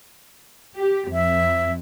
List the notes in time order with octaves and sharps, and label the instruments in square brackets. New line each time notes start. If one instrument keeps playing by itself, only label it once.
[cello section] G4
[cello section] F2 [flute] E5